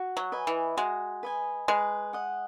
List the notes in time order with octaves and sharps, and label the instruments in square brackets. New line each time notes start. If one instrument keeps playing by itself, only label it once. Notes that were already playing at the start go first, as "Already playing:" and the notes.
Already playing: [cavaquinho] F#4
[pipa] F#3
[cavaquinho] B4 D#5 G#5
[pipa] E3
[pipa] G#3 [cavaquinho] F#4
[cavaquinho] B4 D#5 G#5
[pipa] G#3 [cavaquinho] B4
[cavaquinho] D#5 F#5